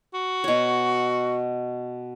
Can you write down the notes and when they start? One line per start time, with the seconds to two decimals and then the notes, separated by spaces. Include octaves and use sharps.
0.14 F#4
0.44 B2 C#5